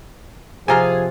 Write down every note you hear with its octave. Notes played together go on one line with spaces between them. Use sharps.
C3 F3 F4 G#4 F5 G#5 A#5